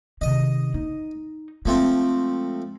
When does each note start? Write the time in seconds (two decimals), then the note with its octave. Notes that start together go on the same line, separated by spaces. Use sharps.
0.21 C3 D#3 D#5
0.74 D#4
1.66 F3 G#3 A3 C4